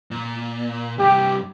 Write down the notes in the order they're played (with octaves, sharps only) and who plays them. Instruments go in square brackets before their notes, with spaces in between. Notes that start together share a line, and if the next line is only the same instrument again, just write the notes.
[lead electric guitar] A#2
[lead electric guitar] G2 C3 [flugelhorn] G4